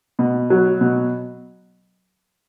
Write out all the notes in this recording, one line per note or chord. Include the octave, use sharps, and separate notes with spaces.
B2
F#3
B2